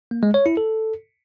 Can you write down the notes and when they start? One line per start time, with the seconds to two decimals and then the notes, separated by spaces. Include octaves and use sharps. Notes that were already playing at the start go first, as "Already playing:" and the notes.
0.11 A#3
0.23 G#3
0.34 C#5
0.46 E4
0.57 A4